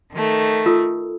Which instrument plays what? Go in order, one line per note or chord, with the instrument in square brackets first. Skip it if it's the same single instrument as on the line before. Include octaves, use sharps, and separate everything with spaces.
[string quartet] D#3 A3
[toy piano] F4 A4 A#4